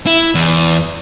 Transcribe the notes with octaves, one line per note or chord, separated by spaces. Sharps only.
E4
E2